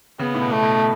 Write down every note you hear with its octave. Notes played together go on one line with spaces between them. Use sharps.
C#3 B3
A2
B2
A3
B2